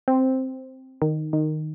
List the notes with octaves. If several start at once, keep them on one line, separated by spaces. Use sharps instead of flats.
C4
D#3
D#3